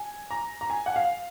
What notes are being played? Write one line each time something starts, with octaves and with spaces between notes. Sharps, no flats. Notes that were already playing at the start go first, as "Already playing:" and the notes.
Already playing: G#5
A#5
A#5
G#5
F#5
F5